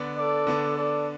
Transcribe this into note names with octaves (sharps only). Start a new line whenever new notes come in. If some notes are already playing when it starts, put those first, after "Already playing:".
Already playing: D3 B3 D4
A4 D5
D3 B3 D4
A4 D5